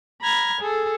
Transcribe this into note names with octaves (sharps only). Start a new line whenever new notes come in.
A#5 B5 F6 G#6
G#4 A4